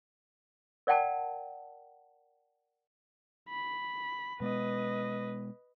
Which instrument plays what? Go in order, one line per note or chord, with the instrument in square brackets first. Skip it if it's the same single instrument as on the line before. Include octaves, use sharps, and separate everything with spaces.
[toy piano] A#4 D5 F#5 G5 A5
[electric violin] B5
[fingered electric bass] B2 G#3 B3 [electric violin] B4 D#5